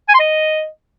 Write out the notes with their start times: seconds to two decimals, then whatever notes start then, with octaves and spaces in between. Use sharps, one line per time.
0.09 G#5
0.14 C6
0.20 D#5